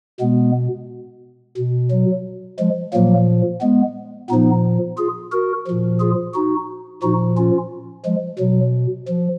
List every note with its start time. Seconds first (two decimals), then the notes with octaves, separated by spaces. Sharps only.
0.20 B2 G#3 B3
1.58 B2
1.91 F#3
2.59 F3 G#3
2.93 A#2 F3 F#3 A#3
3.61 G#3 B3
4.29 A#2 F3 B3 D#4
4.98 F4 G#4
5.32 F#4 A#4
5.67 A#2 F3
6.00 F4 G#4
6.34 D#4 F#4
7.03 A#2 F3 D#4 F#4
7.37 C#4 F4
8.05 F3 G#3
8.39 B2 F#3
9.08 F3